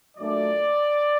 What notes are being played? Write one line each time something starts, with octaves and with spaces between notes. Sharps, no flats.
A#2 F#3 A3 D4 D5